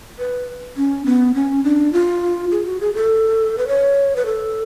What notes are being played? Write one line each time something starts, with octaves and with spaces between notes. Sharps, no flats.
B4
C#4
B3
C#4
D4
F4
G#4
F#4
G#4
A4
B4
C#5
B4
A4